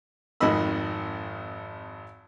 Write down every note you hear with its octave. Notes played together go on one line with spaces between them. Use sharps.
G#1 F2 D#3 D#5 B5 E6